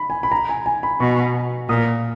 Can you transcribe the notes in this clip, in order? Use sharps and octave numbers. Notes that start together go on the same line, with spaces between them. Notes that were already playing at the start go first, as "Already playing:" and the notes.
Already playing: B5
G#5
B5
A#5
G#5
G#5
B5
B2 C#6
A#2 D#6